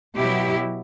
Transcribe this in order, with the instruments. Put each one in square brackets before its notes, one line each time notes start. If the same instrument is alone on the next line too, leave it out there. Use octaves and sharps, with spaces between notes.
[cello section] B2 F#3 E4 G4